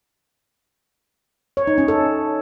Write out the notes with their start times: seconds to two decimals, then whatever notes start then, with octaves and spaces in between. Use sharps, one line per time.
1.57 C#5
1.67 D#4
1.78 C#4
1.88 A4